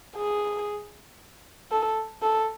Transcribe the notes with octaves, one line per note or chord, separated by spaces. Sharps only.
G#4
A4
A4